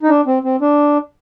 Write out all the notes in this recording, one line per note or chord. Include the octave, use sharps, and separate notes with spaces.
D#4
D4
C4
C4
D4